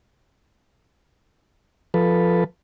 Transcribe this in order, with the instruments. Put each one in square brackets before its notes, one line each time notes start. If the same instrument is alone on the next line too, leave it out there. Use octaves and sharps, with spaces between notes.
[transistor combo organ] F3 A4 B4